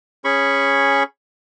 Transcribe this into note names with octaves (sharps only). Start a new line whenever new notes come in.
C#4 G#4 B5 C#6